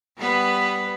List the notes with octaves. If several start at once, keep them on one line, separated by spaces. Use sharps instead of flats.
G3 B3 B4